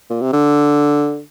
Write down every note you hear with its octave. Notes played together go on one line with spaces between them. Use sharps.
A#2
C3
D3